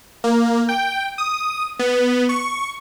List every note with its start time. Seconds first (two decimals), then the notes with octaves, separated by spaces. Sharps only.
0.24 A#3
0.69 G5
1.18 D#6
1.79 B3
2.29 C#6